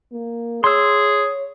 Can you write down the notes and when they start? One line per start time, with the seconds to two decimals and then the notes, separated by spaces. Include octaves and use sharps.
0.12 A#3
0.64 G#4 C#5 C6 E6